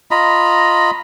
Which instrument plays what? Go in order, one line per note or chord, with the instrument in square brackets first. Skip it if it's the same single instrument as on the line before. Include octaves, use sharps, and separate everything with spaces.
[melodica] F4 D#5 A#5 B5